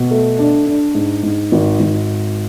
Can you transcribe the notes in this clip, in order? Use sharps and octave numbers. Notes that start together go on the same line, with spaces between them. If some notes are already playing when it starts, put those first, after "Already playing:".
Already playing: B2
A3
D4
D4
G#2
G#2
G#1
G#1